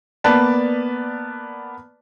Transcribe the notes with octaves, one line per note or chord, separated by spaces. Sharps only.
A#3 B3 B4 D5 A5